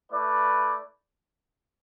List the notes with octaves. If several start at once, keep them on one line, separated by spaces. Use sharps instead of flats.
A3 E4 B4 D5